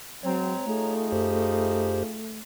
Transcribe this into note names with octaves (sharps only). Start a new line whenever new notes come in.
F#3 G#3 C4 C#5 A#5
A3 D#4 F4 G#4
F#2 G4 C5